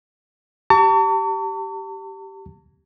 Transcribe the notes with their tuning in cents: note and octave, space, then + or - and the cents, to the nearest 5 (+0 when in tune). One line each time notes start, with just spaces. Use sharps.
G4 -10 A5 +45 C#6 +40